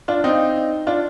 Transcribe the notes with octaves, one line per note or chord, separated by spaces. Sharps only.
D4 F4
C4 D#4
D4 F4